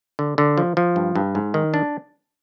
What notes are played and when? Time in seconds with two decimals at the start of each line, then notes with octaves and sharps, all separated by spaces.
0.19 D3
0.38 D3
0.58 F3
0.77 F3
0.96 G2
1.15 G2
1.35 G#2
1.54 D#3
1.74 D4